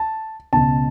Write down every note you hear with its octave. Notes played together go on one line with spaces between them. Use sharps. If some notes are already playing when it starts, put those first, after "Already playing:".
Already playing: A5
C#2 B2 A5